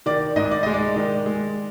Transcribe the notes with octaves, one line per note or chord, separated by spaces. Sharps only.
D#3 D5
G#2 D#5
D5
G#3 D#5
D5
D#3
G#3